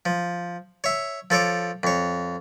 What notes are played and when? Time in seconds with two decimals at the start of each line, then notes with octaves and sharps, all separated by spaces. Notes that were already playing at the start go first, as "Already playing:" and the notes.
0.06 F3
0.84 C#5 E5
1.30 F3 A4 C#5 D6
1.83 F2 C#5